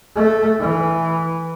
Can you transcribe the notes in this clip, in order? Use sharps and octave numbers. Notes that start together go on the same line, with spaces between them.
A3
E3